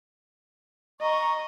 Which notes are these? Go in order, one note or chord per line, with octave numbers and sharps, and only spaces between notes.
D#5 A#5 C#6